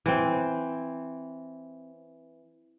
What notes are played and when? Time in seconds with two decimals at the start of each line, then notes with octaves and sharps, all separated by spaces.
0.06 E3 C4